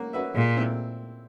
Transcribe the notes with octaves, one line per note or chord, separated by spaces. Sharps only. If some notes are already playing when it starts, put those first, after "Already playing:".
Already playing: A#3 C#4 F#4
C#4 F#4 B4 E5
A#2 G#3
C4 E4